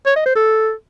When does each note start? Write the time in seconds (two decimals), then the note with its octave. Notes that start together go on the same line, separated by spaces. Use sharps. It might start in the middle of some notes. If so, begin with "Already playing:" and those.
0.06 C#5
0.16 D#5
0.26 C5
0.35 A4